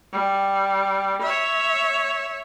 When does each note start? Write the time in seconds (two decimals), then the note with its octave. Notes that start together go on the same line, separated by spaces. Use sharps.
0.12 G3
1.22 C#5 E5